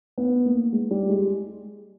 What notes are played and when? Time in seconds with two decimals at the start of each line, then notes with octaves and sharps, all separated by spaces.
0.18 B3
0.45 A#3
0.73 G#3
0.91 G3
1.09 G#3